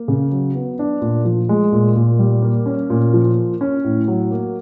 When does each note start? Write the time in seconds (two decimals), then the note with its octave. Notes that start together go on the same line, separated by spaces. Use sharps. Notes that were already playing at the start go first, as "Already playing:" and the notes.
Already playing: A#3
0.08 C#3
0.32 F#3
0.55 B3
0.79 D4
1.01 A#2
1.25 F3
1.49 G#3
1.72 A#2
1.96 A#2
2.19 G3
2.42 A#3
2.66 C#4
2.90 A#2
3.13 F3
3.36 A#3
3.61 C#4
3.84 A2
4.08 F#3
4.31 A#3